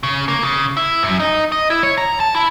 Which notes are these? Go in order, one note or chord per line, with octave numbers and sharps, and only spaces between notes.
C#3
A#3
C#3
E4
F#2
D#4
D#5
E4
C#5
A#5
A5
E4